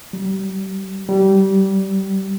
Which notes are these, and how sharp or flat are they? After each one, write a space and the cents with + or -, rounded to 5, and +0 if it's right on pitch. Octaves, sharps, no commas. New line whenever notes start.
G3 -35
G3 -20